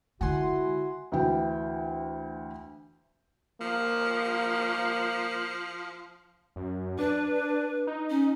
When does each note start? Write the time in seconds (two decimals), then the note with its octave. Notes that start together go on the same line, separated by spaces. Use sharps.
0.21 D3 G#3 E4 F#4 F#5 G#5 C6
1.12 D2 E3 G5
3.61 F3 A#3
6.56 F#2
6.99 D4 B4
7.87 D#4
8.10 C#4